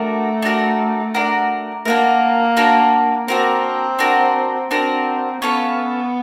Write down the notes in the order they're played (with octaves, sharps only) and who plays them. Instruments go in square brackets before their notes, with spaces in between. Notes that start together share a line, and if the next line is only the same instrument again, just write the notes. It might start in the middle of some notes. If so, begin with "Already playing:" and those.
Already playing: [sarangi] A3 [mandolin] D4 F#4 A#4
[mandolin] D4 F#4 A#4
D4 F#4 A#4
[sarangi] A#3 [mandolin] D4 F#4 A#4
[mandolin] D4 F#4 A#4
[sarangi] C4 [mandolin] D4 F#4 A#4
[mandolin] D4 F#4 A#4
[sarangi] C4 [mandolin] D4 F#4 A#4
[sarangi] B3 [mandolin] C#4 F4 A4 C#5